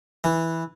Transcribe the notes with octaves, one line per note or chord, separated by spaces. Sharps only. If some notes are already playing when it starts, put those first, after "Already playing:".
E3